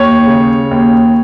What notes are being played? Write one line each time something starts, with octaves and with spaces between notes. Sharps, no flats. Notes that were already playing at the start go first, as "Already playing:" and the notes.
Already playing: D#2 C#5
C#3
D#2